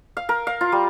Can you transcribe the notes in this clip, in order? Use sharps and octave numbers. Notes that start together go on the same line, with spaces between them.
F5
A#4
F5
F4
G3